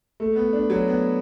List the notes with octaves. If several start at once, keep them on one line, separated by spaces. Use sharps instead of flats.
A3
B3
D4
F#3
B3